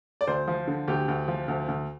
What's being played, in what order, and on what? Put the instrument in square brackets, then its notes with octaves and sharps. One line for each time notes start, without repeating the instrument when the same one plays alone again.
[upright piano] D5
D2 C5
F3
D3
D2 G4
D2
F3
D2
D2